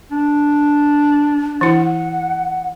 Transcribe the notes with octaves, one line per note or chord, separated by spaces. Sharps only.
D4
E3 E4 F#5